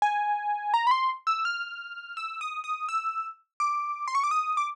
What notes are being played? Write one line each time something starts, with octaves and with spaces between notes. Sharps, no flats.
G#5
A#5
B5
C6
E6
F6
E6
D#6
D#6
E6
D6
C6
C#6
D6
D#6
D6